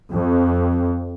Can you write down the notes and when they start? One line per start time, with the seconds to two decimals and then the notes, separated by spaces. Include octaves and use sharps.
0.12 F2